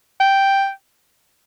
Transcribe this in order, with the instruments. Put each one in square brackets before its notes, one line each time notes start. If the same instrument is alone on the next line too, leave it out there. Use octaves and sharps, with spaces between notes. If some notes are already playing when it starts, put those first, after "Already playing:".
[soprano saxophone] G5